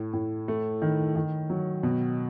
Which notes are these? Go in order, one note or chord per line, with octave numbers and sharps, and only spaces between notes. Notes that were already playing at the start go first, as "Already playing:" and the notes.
Already playing: A2
A2
A3
D#3
D#3
F#3
B2